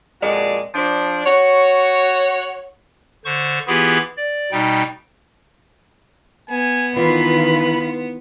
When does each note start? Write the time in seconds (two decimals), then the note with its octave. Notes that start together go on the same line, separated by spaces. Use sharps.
0.21 F2 A#2 G#3 F#4 D5
0.74 F3 D4
1.25 F#4 C#5
3.25 D3 C5 C#6
3.67 E3 B3 E4 F4 G4 G#4
4.17 D5
4.52 B2 G3 D#4 G5
6.50 B3 G#5
6.97 D#3 E3 F4 B4 B5